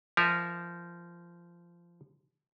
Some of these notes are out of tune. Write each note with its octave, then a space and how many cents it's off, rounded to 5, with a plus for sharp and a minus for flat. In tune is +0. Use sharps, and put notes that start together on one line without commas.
F3 -20 A#4 +0 E5 +0